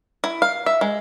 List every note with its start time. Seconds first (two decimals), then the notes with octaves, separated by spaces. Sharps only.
0.24 E4
0.42 F5
0.66 E5
0.81 G#3